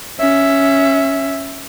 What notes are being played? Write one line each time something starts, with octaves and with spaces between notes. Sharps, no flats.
C#4 E5